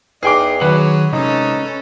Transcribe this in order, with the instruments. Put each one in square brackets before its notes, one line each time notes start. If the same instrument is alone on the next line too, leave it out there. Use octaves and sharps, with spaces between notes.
[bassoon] E2 [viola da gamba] D#4 [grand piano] G#4 G5 D6
[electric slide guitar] D#3 F#5 [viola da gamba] F#3 G#4 [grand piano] B4
[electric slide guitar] C3 G#3 [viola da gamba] C#4 A4 [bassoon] D#4